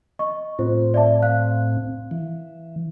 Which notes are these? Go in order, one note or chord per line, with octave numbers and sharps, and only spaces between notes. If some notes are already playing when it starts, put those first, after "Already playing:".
D#5 C#6
A2 C4 F4 C5
D5 E5 A5
F5 F#6
E3